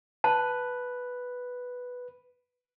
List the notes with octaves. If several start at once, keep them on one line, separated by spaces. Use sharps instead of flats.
B4 A5